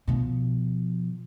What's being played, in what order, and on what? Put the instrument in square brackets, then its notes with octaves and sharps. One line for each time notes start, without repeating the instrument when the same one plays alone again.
[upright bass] B2 F3